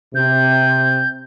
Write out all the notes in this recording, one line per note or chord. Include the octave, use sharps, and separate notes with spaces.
C3 G6